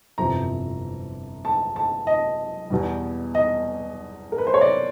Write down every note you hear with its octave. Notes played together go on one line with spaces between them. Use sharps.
G1 F2 C3 E3 A#5
A5
A5
D#5
E2 B2 G3
D#5
A#4
B4
C5
C#5
D5